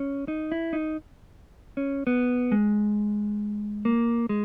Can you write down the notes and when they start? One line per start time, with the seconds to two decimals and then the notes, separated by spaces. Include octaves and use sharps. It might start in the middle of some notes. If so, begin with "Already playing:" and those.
Already playing: C#4
0.28 D#4
0.52 E4
0.73 D#4
1.77 C#4
2.07 B3
2.52 G#3
3.85 A#3
4.29 G#3